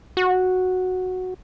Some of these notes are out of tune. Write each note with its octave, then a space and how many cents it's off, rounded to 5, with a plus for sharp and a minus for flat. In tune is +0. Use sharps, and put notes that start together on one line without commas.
F#4 -5